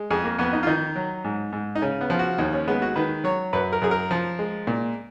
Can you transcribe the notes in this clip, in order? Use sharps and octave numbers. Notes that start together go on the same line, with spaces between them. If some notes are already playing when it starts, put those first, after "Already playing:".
Already playing: G#3
F2 G#4
A#3
F2 B3
D#4
F4
D#3 D#4
F#3
G#2
G#2
D#4
C#3 C#4
B3
F3
F#4
D#2 D#4
C#4
G#3 B3
F#4
D#3 B4
F#3 C#5
F#2 B4
A#4
F#2 G#4
A#4
F3
G#3
A#2